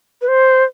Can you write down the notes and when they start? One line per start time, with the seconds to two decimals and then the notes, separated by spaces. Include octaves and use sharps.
0.22 B4
0.28 C5